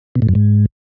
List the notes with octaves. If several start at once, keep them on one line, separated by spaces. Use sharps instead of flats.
B2
A2
F#2
G#2